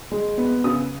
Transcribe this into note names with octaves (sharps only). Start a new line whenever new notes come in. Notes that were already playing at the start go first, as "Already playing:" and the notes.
G#3
B3
C#3 D#6